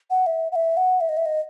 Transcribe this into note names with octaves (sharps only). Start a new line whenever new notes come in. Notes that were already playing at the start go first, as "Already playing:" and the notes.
F#5
E5
F#5
E5
F#5
E5
D#5
E5
D#5